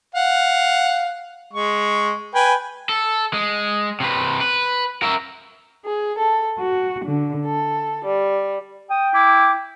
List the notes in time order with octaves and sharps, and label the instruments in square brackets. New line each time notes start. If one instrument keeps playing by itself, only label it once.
[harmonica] F5 F#5
G#3 C#6
B4 G5 G#5
[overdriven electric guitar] A4
G#3
C3 B4
B4
A#4 E5
[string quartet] G#4
A4
F#4
D3
A4
G3
[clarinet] G5 [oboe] D#6
[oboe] E4 [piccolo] D6